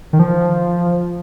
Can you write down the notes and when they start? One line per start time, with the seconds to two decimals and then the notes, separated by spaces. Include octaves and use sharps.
0.13 D#3
0.19 F3